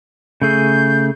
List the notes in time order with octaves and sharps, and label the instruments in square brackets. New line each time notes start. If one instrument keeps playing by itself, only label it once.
[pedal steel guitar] C#3 A3 G#4 [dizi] G6